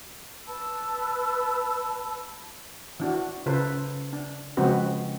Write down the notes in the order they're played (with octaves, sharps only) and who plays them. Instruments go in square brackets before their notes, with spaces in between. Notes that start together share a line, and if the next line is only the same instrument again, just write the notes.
[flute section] B4 A5 B5 E6
[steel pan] E3 D4 F#4
C#3 F4 A4 B4 C5
D4
C#3 F3 G#3 C4 F#4 B4